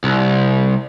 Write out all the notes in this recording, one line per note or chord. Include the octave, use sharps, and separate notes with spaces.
C2